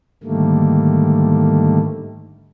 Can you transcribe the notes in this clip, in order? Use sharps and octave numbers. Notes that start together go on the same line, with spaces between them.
G#2 D3 D#3 G3 A3 A#3